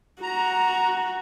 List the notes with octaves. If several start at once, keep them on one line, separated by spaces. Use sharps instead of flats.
F#4 A#5